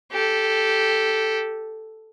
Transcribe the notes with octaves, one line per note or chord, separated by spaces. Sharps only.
G4 A4